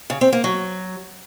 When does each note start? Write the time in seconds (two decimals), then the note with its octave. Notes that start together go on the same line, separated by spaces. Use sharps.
0.10 C#3
0.21 C4
0.32 A#3
0.44 F#3